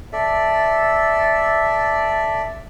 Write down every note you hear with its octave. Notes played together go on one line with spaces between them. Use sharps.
A4 D5 E5